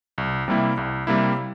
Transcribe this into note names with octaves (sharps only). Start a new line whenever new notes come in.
C2
C3 G3 A#3 E4
C2
C3 G3 A#3 E4